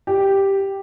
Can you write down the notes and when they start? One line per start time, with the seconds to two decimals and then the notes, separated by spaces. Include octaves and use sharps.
0.07 G4